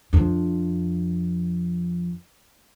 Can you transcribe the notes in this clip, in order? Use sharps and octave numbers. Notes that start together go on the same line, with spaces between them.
F2 D4